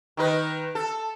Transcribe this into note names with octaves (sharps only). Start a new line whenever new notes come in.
D#3 D#4 B4
A4